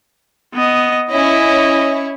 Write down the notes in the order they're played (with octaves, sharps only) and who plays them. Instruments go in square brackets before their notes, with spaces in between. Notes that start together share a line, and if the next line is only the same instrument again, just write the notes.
[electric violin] B3 D#5
[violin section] C#4 E4 C#5 [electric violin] D#5